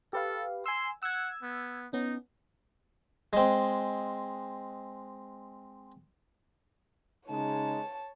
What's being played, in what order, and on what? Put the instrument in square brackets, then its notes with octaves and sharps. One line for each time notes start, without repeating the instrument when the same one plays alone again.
[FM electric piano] G4 B4 F5 [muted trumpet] A4
[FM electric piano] G#5 E6 [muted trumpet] C6
[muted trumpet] F#5 [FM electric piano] E6 G#6
[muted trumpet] B3
[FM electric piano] B3 C#4 [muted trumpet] D#4
[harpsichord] G#3 C4
[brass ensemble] C#3 G#3 D#4 [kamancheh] C#5 A5